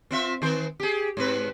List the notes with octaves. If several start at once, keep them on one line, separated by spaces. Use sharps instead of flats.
C4 F4 E5
D#3 C4 C5
G4 G#4
G#2 C4 B4